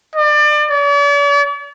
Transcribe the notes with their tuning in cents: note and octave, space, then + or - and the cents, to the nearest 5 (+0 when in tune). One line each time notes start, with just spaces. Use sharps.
D5 +30
D5 -45